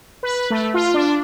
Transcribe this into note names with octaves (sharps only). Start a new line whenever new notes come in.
B4
A3
F4
D4